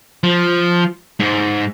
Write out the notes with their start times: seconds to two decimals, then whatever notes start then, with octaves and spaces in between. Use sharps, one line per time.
0.24 F3
1.20 G#2